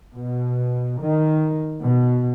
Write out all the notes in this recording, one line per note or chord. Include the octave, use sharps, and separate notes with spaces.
B2
D#3
B2